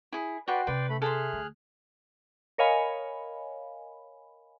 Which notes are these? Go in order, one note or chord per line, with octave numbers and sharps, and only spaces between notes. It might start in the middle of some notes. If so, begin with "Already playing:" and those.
E4 G#4
F#4 B4 D5 G5 C6
C3 C#4 B4 D5 G5 C6
A3 B5
G#4 A4 E5 C6 F6 F#6
D2
A#4 C#5 D#5 F5 G#5 B5